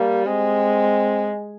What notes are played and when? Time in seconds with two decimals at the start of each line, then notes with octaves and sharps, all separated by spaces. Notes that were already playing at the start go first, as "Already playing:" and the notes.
Already playing: G3 A#3
0.26 G#3 C4